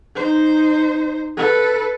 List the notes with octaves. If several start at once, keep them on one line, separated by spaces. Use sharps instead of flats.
D#4 C5
A4 B4